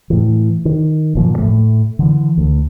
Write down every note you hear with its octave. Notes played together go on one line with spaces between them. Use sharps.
A2 E3
D#3
G1 A#2 F3
A2 A3
D3 E3
D2